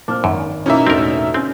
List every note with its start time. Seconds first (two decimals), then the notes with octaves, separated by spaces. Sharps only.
0.08 A#2 C4 D4 F6
0.24 G#1 F#2 G#5
0.66 B2 E3 A#3 C#4 D#4 E5
0.87 E1 A1 B2 D3 C4 A#4
1.34 C4 C#4